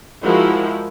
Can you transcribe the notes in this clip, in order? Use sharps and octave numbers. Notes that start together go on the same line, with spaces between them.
F3 G#3 E4 F#4 A#4